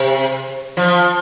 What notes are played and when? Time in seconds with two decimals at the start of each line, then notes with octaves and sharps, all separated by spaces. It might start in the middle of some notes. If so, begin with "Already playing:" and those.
Already playing: C3
0.77 F3